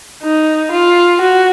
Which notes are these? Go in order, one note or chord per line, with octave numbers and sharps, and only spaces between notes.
D#4
F4
F#4